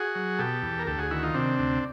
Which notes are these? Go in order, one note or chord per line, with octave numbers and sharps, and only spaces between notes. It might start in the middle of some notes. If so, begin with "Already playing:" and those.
Already playing: F#4 G#4
F#3
B2 G4 A4
E2
A#4
D2 G4 A4
F#4 G#4
D#3 E4 F#4
D#4 F4
C3 C4 D4
D2